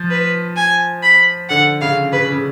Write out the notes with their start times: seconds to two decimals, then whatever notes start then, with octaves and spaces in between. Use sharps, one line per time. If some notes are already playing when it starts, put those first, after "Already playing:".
Already playing: F3
0.10 B4
0.56 G#5
1.03 B5
1.50 D3 F#5
1.81 C#3 F5
2.12 C#3 B4
2.32 C#3